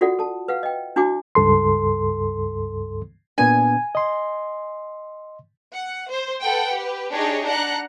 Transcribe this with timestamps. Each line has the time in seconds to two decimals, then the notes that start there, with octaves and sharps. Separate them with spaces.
0.01 F4 F#4 A4 D5 F#5
0.19 A4 A5
0.48 B4 F5 F#5
0.63 D#5 G5
0.96 D4 E4 F#4 G#5 D6
1.35 C#2 G2 A4 C6
3.38 A#2 B3 D4 G#5
3.95 D#5 C6
5.74 F#5
6.11 C5
6.43 A4 B4 F#5 G5
6.74 G4 B4
7.13 D4 D#4 G4 G#4 C#5 D#5
7.45 D4 F#5 A#5 F#6